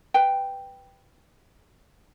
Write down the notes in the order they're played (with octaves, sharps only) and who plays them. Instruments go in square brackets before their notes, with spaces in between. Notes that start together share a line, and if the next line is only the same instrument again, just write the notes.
[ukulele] B4 G5